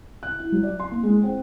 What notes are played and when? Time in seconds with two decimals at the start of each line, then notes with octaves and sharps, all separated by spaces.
0.23 F#6
0.39 E4
0.52 F#3
0.63 D5
0.80 C6
0.91 A#3
1.03 G#3
1.23 C4